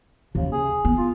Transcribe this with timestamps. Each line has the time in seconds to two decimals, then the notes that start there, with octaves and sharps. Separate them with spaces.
0.35 D#2 C#3
0.52 G#4
0.85 B3
0.97 F4